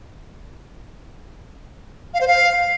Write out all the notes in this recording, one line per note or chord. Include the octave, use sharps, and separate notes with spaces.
F5
C5
F5